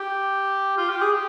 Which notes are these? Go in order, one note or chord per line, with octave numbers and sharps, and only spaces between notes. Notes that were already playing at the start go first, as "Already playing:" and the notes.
Already playing: G4
F4
G4
G#4
G4